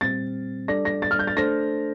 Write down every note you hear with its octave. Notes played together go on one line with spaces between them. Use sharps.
A#2 G3 C4 A6
G3 D4 A4 D5 A#6
A#6
A6
F6
G6
A6
A3 D4 A4 C5 A#6